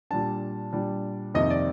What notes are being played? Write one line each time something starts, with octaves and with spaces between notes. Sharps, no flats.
A#2 G3 D4 A5
A#2 G3 D4
F2 C3 D#3 A#3 D#5
D5